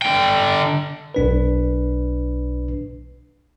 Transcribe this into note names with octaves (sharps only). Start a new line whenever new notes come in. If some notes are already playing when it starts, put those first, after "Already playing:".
D3 G5
B1 D4 B4